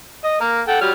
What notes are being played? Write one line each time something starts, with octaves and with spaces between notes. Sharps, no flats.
D#5
A#3 A#4
A4 F#5 G5
F#3 G3 F6